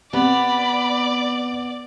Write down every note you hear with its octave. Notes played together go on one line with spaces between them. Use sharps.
C3 B3 D5 B5